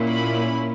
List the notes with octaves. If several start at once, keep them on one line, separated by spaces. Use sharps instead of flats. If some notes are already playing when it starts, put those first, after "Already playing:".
Already playing: A#2 A#3 C#4 E4
B5